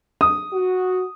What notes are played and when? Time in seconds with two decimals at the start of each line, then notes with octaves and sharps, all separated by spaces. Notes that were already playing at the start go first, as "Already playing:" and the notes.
0.21 D#6
0.53 F#4